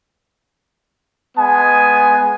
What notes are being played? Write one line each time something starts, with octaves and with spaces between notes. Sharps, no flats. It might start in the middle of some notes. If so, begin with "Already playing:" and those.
G#3 B3 G#5